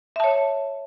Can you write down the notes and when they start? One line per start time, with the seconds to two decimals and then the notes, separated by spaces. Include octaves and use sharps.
0.16 E5
0.20 A5
0.24 C#5